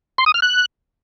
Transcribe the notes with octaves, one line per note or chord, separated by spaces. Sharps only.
C6
D#6
F6
F#6